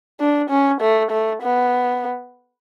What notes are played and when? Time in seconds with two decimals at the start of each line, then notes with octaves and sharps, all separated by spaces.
0.20 D4
0.50 C#4
0.81 A3
1.11 A3
1.42 B3